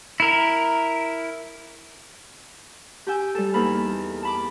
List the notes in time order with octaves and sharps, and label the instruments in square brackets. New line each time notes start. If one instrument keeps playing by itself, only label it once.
[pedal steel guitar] E4 A#4
[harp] G4 G5 G#5 E6 G6
G3 A4
E2 A#3 D#4 A4 B5 F6
A5 B5 D6